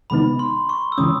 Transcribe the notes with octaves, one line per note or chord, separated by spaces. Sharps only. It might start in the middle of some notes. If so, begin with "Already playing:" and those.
C3 D#3 G#3 B3 D#4 B5
C6
C#6
E6
C#3 E3 G#3 C#4 D#6